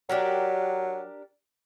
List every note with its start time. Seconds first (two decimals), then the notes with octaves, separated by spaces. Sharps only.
0.09 F#3 D4 G4 A#4